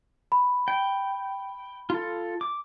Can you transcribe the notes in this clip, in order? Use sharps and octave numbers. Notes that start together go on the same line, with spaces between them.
B5
G5
F4 A4
D6